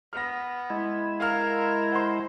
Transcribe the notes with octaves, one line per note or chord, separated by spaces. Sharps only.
B3 F6 A#6
G#3 E4
A#4 F5 F6
C5 F#5 A#5 C6